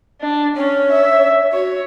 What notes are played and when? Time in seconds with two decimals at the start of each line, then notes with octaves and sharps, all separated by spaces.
0.21 D4
0.56 C#4 C#5
0.91 E5
1.53 F#4 C#5